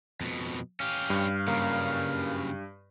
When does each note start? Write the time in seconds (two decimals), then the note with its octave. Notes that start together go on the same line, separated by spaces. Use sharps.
0.21 F2 B2
0.80 C#4 G4 F5
1.10 G2
1.48 F#2 C#3 A#3